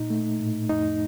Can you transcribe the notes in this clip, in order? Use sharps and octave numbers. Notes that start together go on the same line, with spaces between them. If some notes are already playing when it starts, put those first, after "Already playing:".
Already playing: A#2 D#4
A3
A2
F2 D#4